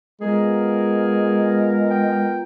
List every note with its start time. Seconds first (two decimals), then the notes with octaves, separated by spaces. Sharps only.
0.21 G#3 B3 F4 G#4 A#4
1.90 G5